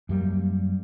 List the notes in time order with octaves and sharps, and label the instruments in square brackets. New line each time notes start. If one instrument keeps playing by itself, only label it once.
[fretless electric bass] F#2 G3 A#3